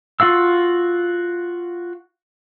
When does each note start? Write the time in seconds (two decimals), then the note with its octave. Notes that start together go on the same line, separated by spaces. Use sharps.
0.20 F4 F#4 F5 E6